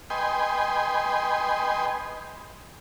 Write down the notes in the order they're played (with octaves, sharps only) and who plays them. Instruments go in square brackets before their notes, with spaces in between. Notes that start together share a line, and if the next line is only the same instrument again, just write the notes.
[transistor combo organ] B4 D#5 G5 G#5 C6